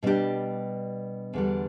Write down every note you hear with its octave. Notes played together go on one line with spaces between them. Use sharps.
B2 G3 D4 G4
E2 D3 G3